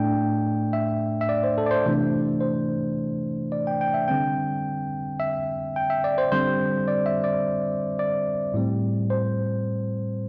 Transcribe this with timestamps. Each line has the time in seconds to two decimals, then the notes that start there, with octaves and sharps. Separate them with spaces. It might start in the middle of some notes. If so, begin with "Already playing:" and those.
Already playing: A2 A3 D4 G5
0.73 E5
1.21 E5
1.29 D5
1.44 C5
1.58 A4
1.66 D5
1.71 C5
1.86 C3 E3 A3 D4
2.40 C5
3.52 D5
3.67 G5
3.81 G5
3.94 E5
4.08 D3 G3 C4 G5
5.20 E5
5.76 G5
5.90 E5
6.04 D5
6.18 C5
6.32 D3 G3 C4 C5
6.88 D5
7.06 E5
7.24 D5
7.99 D5
8.54 A2 G3 C4
9.10 C5